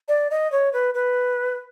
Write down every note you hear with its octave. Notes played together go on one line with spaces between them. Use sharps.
D5
D#5
C#5
B4
B4